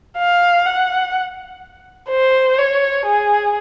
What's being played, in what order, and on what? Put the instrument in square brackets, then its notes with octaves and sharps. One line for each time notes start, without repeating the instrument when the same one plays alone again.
[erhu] F5
F#5
C5
C#5
G#4